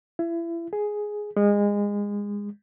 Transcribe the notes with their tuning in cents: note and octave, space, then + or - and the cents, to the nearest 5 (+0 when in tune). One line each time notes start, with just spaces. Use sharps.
E4 +30
G#4 +5
G#3 -25